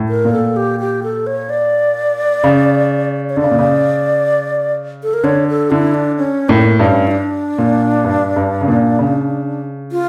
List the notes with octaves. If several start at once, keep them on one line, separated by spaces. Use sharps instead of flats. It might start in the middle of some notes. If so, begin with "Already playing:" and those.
Already playing: A2
A#4
A#2
A4
G4
G4
A4
C#5
D5
C#3
C#5
D3 D5
C#3
A#2
C#3
A4
A#4
D3 C#5
A4
D3 E4
D4
C#4
A2 A#3
G2 C#4
E4
D4
A#2
G2
G2
C#3
A#2
C#3
F4